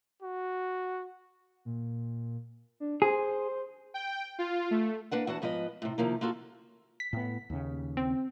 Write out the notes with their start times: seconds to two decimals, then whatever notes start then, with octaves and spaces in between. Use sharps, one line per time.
0.23 F#4
1.65 A#2
2.80 D4
3.02 G#4 C5
3.94 G5
4.39 F4
4.71 A3
5.11 A#3 D4 B4 F#5
5.27 E2 F#4 F#5 A5
5.42 G#2 F3 B3 B4 D#5
5.82 A2 C3
5.98 C3 D#3 F3 A#3
6.21 A#3 F4 F#4 A4
7.00 B6
7.13 A2 B3
7.50 D#2 C#3
7.97 C4